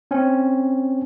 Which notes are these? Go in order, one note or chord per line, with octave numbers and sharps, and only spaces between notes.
C4 C#4